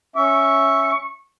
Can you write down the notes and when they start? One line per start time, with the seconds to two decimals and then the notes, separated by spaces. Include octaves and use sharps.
0.16 C#4 E5 C#6